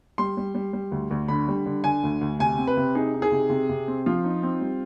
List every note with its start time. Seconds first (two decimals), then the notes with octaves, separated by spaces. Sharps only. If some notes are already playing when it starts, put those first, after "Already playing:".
0.18 G3 C6
0.37 G3
0.55 G3
0.73 G3
0.92 D2
1.11 D2
1.28 D3 B5
1.48 G3
1.66 D3
1.84 D3 G#5
2.03 D2
2.21 D2
2.39 C3 G#5
2.58 C4
2.67 B4
2.77 C3
2.95 D#4 G#4
3.14 D#4
3.22 G#4
3.32 C3
3.50 C3
3.69 C3
3.88 C4
4.06 F3 F4
4.24 D#4
4.43 C4
4.61 G3